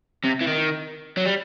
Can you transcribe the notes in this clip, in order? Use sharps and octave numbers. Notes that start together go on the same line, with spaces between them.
C3
E3
D#3
F#3
G3